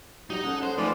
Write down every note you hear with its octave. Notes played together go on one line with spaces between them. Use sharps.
F#3 G3 D#4 D#5
C#4 G#4 A4 F#5
C5
F3 G#3 A3 D#4 B4 C5 D5